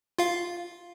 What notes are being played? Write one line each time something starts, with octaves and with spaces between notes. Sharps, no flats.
F4 F5